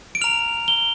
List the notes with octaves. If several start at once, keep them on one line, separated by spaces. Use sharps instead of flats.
D7
A#5 F6 F7
G7